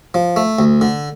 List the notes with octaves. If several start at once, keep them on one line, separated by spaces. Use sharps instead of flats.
F3
A3
D2
D3